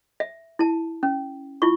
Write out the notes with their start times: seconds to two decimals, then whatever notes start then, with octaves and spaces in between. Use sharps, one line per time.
0.20 E5
0.59 E4 A5
1.03 C#4
1.62 E4 F4 C#6